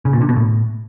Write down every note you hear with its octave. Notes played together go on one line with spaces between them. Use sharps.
C#3
A#2
D3
B2
A2